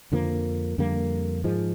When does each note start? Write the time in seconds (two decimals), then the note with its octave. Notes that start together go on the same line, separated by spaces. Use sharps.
0.12 F2 D3 F3 A#3
0.78 F2 D3 G3 A#3
1.44 G#2 F3 G#3